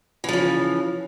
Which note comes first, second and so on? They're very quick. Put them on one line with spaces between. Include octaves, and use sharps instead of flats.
E3 F3 C#3